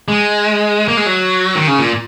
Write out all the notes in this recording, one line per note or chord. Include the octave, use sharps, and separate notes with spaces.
G#3
A#3
G#3
F#3
D#3
C#3
A#2